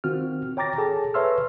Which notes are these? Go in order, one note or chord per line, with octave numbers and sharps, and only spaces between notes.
D#3 C4 F4 F#4 F6
C#5 G5 A#5 D6 A6 A#6
G#4 A4 G#5 A5
B4 C#5 E5 C6 E6 F6